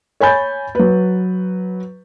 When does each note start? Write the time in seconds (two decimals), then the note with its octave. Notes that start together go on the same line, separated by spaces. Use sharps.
0.20 C#5 G#5 B5 G6 A6
0.75 F#3 B4